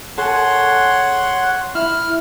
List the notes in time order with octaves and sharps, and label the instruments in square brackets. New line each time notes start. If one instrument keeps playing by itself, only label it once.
[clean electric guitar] G#4 A4 [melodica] C#5 C6 [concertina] F#5
[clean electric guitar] E4 [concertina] F6